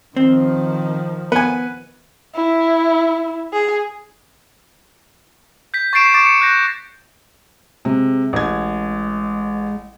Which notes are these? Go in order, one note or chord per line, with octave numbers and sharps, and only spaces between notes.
D#3 F3 C4
B3 B4 G#5
E4
G#4
G6 B6
C#6 A6 B6 C7 D7 E7
C#6 D6 A6 D7 E7
C#7
F#6 G6 A#6
F#6
C3 G#3
A1 G#6